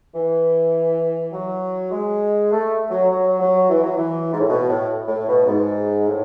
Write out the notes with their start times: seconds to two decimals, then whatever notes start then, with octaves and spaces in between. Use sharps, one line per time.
0.14 E3
1.32 F#3
1.91 G#3
2.51 A3
2.90 F#3
3.11 F#3
3.40 F#3
3.70 E3
3.84 F#3
3.97 E3
4.32 G#2
4.40 A2
4.49 B2
4.69 A2
5.08 A2
5.28 B2
5.47 G#2
6.07 A2